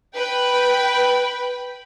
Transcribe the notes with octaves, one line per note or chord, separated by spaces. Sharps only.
B4 G5 B5